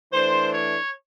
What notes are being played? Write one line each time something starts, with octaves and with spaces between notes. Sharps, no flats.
E3 A3 D4 C5
C#5